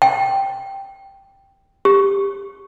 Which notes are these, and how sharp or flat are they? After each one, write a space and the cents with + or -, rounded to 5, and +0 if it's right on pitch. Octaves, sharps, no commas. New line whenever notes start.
G5 +0
G4 +20